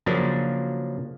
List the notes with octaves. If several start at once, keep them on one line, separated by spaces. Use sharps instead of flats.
C#3 F3 F#3 A#3 D4